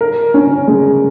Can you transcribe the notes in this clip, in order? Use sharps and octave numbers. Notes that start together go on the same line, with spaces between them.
A#4
C#4
G#3